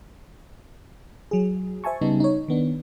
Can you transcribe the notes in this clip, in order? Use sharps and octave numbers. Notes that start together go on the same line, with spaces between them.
F#3 G#4
C5 E5 G#5 A5 C#6
C#3 G3 B3 D#4
D#4 C#5
D#3 B3 D4